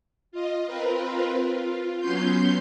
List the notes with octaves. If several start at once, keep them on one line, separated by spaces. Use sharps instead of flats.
F4 D#5
C4 F4 A#4 B4
F4
F#3 B3 C#4 C6 G6